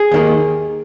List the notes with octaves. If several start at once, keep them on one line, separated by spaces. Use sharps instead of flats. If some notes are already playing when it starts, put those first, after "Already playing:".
Already playing: G#4
D#2 D#3 A#3